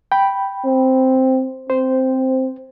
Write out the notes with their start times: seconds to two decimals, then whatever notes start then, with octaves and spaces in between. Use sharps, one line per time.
0.12 G5 B5
0.65 C4
1.70 C4 C5